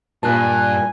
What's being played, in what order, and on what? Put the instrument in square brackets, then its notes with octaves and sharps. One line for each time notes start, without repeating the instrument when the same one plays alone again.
[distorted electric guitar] G2 [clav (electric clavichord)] A#2 [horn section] A#4 G#5 [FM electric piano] A5 F#6